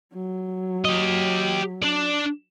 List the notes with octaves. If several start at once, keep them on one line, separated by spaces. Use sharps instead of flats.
F#3
G4 D#5
D4 D5